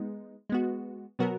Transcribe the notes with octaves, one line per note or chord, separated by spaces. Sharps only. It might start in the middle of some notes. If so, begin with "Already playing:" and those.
Already playing: G#3 B3 D#4
G#3 B3 F#4
B2 F#3 B3 F#4 A#4